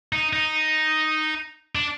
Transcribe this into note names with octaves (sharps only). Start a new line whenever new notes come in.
D#4
D#4
D4